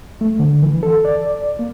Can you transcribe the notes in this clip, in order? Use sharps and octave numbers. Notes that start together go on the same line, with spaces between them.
A3
D3
E3
A4
D5
A#3